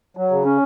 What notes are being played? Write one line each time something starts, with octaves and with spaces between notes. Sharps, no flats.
F#3
C#3
C#4